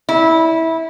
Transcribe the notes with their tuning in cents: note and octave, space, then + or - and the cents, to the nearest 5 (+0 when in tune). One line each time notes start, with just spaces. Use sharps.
E4 -20